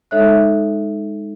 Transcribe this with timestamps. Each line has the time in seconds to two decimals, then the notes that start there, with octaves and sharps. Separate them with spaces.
0.11 G#3 D#4 A4 C#5 E5 F#6